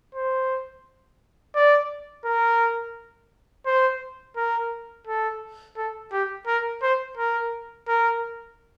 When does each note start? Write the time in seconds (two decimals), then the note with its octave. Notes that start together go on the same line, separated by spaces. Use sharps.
0.15 C5
1.55 D5
2.25 A#4
3.66 C5
4.36 A#4
5.07 A4
5.77 A4
6.12 G4
6.47 A#4
6.82 C5
7.17 A#4
7.88 A#4